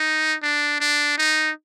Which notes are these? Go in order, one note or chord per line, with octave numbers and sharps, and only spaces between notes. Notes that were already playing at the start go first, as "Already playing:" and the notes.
Already playing: D#4
D4
D4
D#4